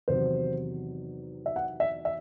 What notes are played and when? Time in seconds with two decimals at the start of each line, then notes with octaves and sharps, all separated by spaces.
0.08 E2 C3 D#3 F#3 C5
1.46 E5
1.56 F#5
1.80 E5
2.05 E5